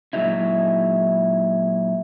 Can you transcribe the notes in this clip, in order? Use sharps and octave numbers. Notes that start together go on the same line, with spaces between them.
A#2 F#3 G#3 D#4 E4